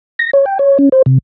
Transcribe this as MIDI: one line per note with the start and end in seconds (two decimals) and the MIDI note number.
0.19 0.31 94
0.33 0.45 73
0.46 0.58 79
0.59 0.78 73
0.79 0.89 61
0.92 1.02 72
1.06 1.18 48